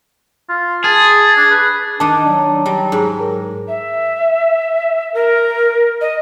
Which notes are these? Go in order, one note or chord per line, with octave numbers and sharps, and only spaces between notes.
F4
G#4 A5
D4
B4
D#3 D4 D#4 A5 D6
F#3 D4
G3 A#5
G#2
A#4
E5
A#4
D#5